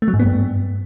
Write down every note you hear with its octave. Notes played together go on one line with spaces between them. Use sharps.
A3
F#3
G#2
B3
G2